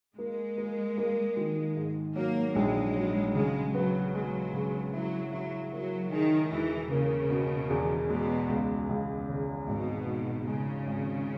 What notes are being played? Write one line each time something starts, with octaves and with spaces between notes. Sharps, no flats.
G#3 A#3
A#3
A#3
D#3
G#2
F#3 A#3
A#1 G#3
F#3
C#3 G#3
F#3 B3
F#3 G#3
C#3
F#3 E4
F#3 E4
F#3 A#3
D#3 G#4
E1 E3
C#3 A#3
B2
E2
B2 G#3
C#2
C#2
C#3
G#1 B2
G#2
C#3 G#3
G#1